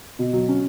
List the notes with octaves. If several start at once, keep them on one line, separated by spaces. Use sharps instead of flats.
B2
F#3
C#4